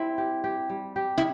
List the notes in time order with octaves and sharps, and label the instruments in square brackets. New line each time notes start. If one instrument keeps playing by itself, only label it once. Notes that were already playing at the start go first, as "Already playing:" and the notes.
Already playing: [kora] G3 C4 [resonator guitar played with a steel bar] E4
[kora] G4
G4
G3
G4
[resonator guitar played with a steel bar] E4